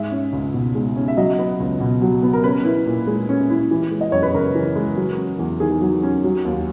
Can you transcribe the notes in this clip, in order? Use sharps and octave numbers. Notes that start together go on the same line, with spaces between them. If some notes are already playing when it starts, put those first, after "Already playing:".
Already playing: G#2 G#3 E5
C#4
C#2
B2
G#3
C#4
E5
F#3 D#5
B3
C#2
B2
F#3
B3
A#4
C#4 B4
E4
A#2
G#3
C#4
E4
E3
G#3
D#5
F#2 C#5
B4
C#3 A#4
E3
G#3
F#3
C#4
E2
D#3 G#4
F#3
C#4
F#3
D#2